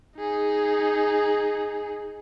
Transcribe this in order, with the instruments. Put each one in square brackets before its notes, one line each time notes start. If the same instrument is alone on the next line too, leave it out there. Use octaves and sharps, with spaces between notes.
[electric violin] D#4 G#4